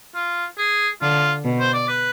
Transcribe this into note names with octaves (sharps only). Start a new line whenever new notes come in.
F4
G#4
D3 F4
B2
C5
D5
B4